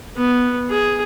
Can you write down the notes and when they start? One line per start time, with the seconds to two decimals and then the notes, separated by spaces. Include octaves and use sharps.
0.17 B3
0.70 G#4